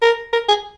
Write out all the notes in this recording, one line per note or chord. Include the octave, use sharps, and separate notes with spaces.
A#4
A#4
G#4